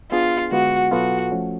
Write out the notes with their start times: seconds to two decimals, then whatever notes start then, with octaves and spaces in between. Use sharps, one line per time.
0.12 B3 D4 F4 G#4
0.52 D3 G#3 B3 F4 F#4
0.91 B2 F#3 B3 F4 F#4 A4
1.32 F3 A3 C#4